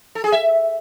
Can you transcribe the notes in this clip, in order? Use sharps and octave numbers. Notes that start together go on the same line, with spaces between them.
A4
G#4
E5